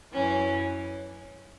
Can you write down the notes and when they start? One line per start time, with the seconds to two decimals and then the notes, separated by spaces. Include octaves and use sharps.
0.13 F#2 E3 C#4